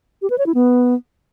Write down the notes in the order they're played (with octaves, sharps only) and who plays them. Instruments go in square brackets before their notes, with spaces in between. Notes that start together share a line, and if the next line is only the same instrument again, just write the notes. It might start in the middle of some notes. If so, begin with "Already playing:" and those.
[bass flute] G4
B4
C#5
E4
B3